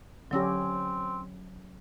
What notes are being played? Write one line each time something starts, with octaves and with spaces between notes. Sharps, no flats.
D3 F#3 C4 C#4 G4 E6 A#6